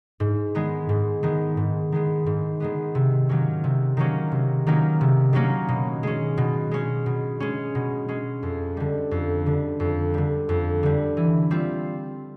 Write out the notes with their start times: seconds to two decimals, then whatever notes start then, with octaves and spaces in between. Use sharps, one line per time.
0.20 G#2
0.55 D#3 G#3 B3
0.89 G#2
1.23 D#3 G#3 B3
1.57 G#2
1.92 D#3 G#3 B3
2.26 G#2
2.60 D#3 G#3 B3
2.95 C3
3.29 D#3 F#3 A#3 C#4
3.64 C3
3.97 D#3 F#3 A#3 C#4
4.32 C3
4.67 D#3 F#3 A#3 C#4
5.01 C3
5.33 D#3 F#3 A#3 C#4
5.69 B2
6.03 G#3 C#4
6.37 B2
6.71 G#3 C#4
7.06 B2
7.40 G#3 C#4
7.75 B2
8.08 G#3 C#4
8.43 F2
8.77 D3 G3
9.11 F2
9.46 D3 G3
9.80 F2
10.14 D3 G3
10.49 F2
10.83 D3 G3
11.17 E3
11.51 G3 C4 F4